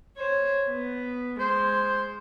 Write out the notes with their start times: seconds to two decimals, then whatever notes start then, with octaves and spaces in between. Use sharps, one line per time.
0.17 C5 C#5
0.68 B3
1.40 G#3 C5